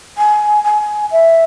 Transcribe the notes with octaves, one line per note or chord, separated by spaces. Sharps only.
G#5
G#5
E5